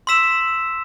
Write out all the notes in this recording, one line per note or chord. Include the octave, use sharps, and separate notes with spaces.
C6 E6 B6 E7